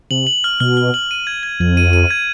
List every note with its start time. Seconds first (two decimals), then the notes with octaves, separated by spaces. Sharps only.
0.11 C3 F#7
0.27 F#7
0.44 F6
0.60 B2 F6
0.77 F6
0.94 F#7
1.11 D#7
1.27 G#6
1.43 G#6
1.60 F2 G#6
1.77 D#7
1.93 D#7
2.11 G#6